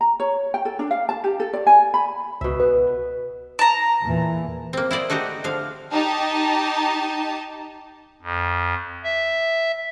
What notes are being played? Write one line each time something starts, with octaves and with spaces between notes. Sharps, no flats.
A#5
C#5
G5
A4
D4
F5
A5
G4
A4
D5
G#5
B5
C#2 B2 E5
B3 B4
A5 A#5
E2 A#2 E3
A#3 C4
E4 C5 D5 D#5
A3 D#4 F#4 G4 F#5
D3 F3 F5
D#4 G4 A5
F2
E5